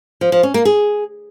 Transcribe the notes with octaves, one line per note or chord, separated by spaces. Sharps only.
F3
F3
C#4
A#3
G#4